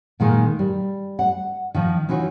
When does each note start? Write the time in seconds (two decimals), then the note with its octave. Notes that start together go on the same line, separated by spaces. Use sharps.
0.20 A#2 D#3 G#3 D#4 G#5
0.59 G3
1.19 F#5
1.74 D#3 F3 D#4
2.09 E3 D#4 F4 F#4 C#5